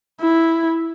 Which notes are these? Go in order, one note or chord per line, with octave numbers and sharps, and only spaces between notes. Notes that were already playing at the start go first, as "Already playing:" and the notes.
E4